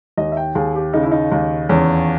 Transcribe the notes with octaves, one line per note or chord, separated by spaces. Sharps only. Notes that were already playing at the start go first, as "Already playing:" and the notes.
D#2 D#5
E5
G5
D#2 G#4
G4
C#3 D#4
E4
D#4
D#2
E2 C#4